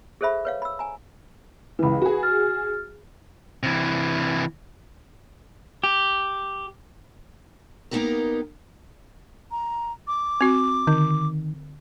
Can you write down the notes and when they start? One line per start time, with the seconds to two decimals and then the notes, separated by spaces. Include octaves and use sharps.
0.21 G#4 A4 C5 E5 B5
0.45 B4 C#5 F5
0.62 B5 E6
0.79 G#5 A#5
1.79 C#2 E3 B4 B5
2.02 F#4 G#4
2.23 F6 A6
3.63 C3 E3
5.84 G4
7.91 A#3 B3 D#4 F#4 G4 A#4
9.51 A#5
10.07 D6
10.41 C4 F#4
10.87 D3 D#3